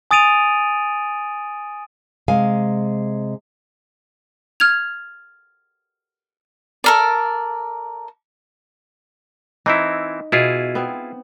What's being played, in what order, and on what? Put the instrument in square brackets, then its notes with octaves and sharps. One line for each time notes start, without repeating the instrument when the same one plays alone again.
[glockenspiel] G#5 D#6 A6 D7 D#7 F7
[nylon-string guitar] C3 G#3 F5 G#5
[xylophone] F6 G#6 F7
[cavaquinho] A4 A#4 D5
[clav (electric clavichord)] E3 C4 E4 [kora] D#4
[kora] B2 [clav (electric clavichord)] E4 F4 G#4
[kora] B3 C4